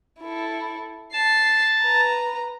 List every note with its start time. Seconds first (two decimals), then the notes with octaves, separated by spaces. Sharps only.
0.20 E4 A4
1.13 A5 C7
1.81 B4 A#5